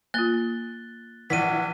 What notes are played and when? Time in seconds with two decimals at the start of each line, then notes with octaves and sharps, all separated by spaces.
0.14 A#3 F4 F#6 A6 G7
1.30 A#1 E3 F#5 B6 D#7